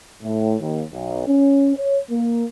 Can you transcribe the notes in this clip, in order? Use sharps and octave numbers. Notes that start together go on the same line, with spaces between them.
A2
D#2
B1
C#4
C#5
A#3